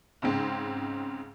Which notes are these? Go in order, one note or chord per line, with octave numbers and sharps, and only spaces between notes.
G#2 C#3 G#3 C4